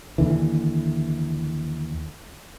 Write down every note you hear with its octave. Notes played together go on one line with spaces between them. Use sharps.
D#2 D3 E3